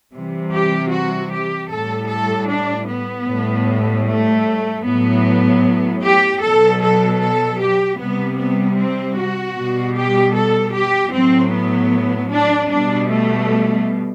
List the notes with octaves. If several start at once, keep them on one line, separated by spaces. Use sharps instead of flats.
C3 E3 G3
G4
F#4
G4
A2 G3 A4
A4
D4
B3
A2 G3
A3
A2 F#3 B3
G4
B2 F#3 A4
A4
A4
G4
C3 G3 B3
B3
C4
F#4
B2 G3
G4
A4
G4
A2 F#3 C4
B3
D4
B2 G3 D4
A3